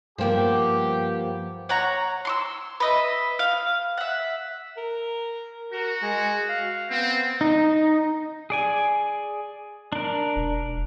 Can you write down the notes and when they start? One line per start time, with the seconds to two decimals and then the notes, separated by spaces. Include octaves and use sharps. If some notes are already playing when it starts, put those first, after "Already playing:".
0.18 G2 F3 A#3 B3 G4 C5 G5
1.69 C#5 F#5 A#5
2.25 C6 C#6 E6
2.80 B4 D#5 E5
3.39 F5
3.98 E5 F#5
4.77 A#4
5.73 F#4 A#4
6.02 G#3
6.49 F5
6.91 B3 C4
7.41 D#4
8.50 G#4 D5 G#5
9.92 D4 A#4
10.36 E1